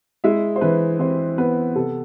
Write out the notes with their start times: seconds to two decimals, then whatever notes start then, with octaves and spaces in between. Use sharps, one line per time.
0.24 G#3 E4 E5
0.56 C5
0.61 E3 B4
0.99 E3 C4 C5
1.38 B3 B4
1.76 C3 A4